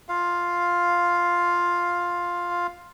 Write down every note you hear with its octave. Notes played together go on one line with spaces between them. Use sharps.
F4 F5